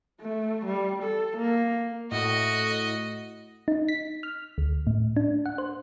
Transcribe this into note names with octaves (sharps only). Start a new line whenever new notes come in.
A3
G3
A4
A#3
A2 F#4 D#5
D#4
B6
F6
D2
A2
D4
F#5
C5